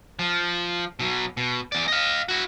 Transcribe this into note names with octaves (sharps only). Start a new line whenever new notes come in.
F3
B2 F#3
B2
E2 D5
D#5 F5
E4 F#4